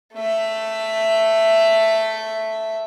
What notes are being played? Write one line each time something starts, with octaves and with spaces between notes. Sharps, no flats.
A3 E5